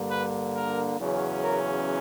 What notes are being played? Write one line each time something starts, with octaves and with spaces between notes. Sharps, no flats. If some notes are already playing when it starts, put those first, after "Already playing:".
Already playing: G2 D3 A#3
B4
A#4
E2 C#3 F#3 C#4
A#4